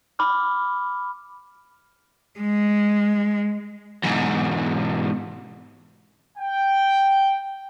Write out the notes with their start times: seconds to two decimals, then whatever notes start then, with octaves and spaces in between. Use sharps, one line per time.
0.19 B5 D6 F6
2.40 G#3
4.04 E2 G#2
6.38 G5